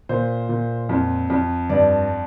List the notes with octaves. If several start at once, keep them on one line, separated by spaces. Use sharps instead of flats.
A#2 C5
A#2
F2
F2
G2 D5